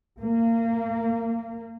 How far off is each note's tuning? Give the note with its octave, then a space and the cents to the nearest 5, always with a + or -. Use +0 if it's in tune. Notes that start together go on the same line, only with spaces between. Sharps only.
A#3 -30